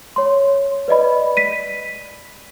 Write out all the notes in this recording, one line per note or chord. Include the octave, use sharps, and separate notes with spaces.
C#5 C6
B4 D5 D#5 B5
B6 D#7